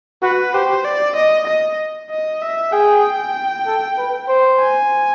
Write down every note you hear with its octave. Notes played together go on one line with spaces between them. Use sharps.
F#4 B4
G4 C5
D5
D#5
D#5
D#5
E5
G#4 G5
A4
B4
C5
G#5